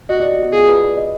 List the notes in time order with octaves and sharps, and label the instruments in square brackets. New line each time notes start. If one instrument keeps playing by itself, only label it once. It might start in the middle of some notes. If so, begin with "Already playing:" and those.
[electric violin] F#4 [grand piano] D#5
[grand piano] D5
F#4
F#4
[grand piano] F4 [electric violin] G#4
[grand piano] B4
D5
D#5